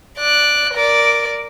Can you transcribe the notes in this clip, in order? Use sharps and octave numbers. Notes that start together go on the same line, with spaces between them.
D5 F#6
A#4 D5